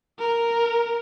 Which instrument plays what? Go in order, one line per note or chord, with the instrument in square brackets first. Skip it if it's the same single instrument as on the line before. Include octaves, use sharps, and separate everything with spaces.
[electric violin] A#4